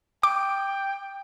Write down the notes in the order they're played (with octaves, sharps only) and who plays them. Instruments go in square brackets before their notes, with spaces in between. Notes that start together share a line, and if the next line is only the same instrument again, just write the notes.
[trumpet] G5 [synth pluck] D6